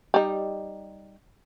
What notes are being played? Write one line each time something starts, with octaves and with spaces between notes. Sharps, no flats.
G3 D#4